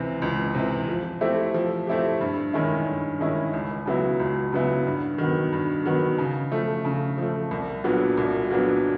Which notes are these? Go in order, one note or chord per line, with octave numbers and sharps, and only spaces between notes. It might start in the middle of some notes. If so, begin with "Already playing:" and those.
Already playing: C#2 C3 E3
C#2
C3 E3
F3
A3 C4 E4 G4
F3
A3 C4 E4 G4
G2
D#3 G#3 C#4 E4
G2
D#3 G#3 C#4 E4
C#2
C#3 F#3 B3 E4
C#2
C#3 F#3 B3 E4
G2
D#3 F#3 B3
G2
D#3 F#3 B3
C#3
F3 A3
C#3
F3 A3
C2
A#2 F#3 B3 D4
C2
A#2 F#3 B3 D4